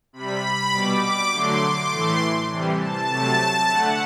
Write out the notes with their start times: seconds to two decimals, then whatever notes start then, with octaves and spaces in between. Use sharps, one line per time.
0.13 C3 G3 B5
0.72 B2 G3 D6
1.31 D3 F#3 A3 C6
1.61 D6
1.91 A2 E3 A3 C6
2.50 C3 E3 G3
2.80 A5
3.09 C3 F#3 A3
3.69 D3 A3 F#5